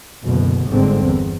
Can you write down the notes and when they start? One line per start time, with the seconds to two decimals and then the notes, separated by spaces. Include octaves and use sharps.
0.24 F#1 D2 B2
0.67 G1 G#2 D3 C4
1.04 E2